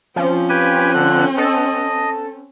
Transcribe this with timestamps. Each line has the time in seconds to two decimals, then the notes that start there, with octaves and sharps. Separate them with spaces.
0.16 F3 C4 C#4
0.50 G4 B4 G#5
0.94 D3 F#6
1.38 A4 D#5